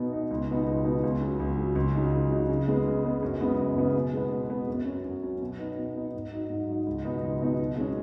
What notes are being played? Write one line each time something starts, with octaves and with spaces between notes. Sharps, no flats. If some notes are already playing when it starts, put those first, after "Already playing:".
Already playing: B2 B3 D#4
B3 D#4
C#2
B2 B3 D#4
C#2
B2 B3 D#4
C#2
C#3 F#3
C#2
C#3 F#3
C#2
C#3 F#3 D#4
C#2
C#3 F#3 D#4
C#3
G#3 B3
C#3
G#3 B3
F#2
C#3 G#3 B3
F#2
C#3 G#3 B3
B2
G#3 B3
B2
G#3 B3
F#2
F#3 C#4
F#2
F#3 C#4
B2
B3 D#4
B2
B3 D#4
G#2
F#3 D#4
G#2
F#3 D#4
C#2
B2 F#3 B3 D#4
C#2
B2 F#3 B3 D#4
B2
G#3 C#4